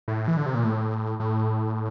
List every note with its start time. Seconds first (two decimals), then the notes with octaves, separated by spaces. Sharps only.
0.08 A2
0.28 E3
0.37 D3
0.46 C3
0.55 A#2
0.64 A2
1.20 A2